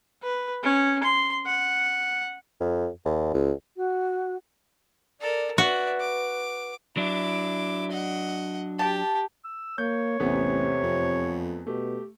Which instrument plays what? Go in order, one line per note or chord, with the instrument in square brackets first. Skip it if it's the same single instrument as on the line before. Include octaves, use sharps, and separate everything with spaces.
[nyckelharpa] B4
C#4
C6
F#5
[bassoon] F2
D#2
C#2
[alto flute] F#4
[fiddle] A4 A#4 [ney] D5
[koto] F#4 [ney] B4 [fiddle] D5 E5
[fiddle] D6
[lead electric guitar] F#3 D4 [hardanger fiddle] E4 D6
[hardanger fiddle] D#5 F#5
[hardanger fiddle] G4 [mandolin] A5
[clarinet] E6
[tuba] A#3 [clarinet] C#5 [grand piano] G6
[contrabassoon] A1 [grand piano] E2 A3 B3 [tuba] C3
[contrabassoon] F2
[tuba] B2 [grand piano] A3 [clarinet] G4